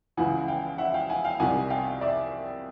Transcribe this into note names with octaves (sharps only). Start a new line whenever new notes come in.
C#2 C#3 E3 F#5 G#5
F#5
F5 G5
E5 F#5
F5 G5
F#5 G#5
F5 G5
C2 C3 D#3 G3 F#5 G#5
F5 G5
D5 E5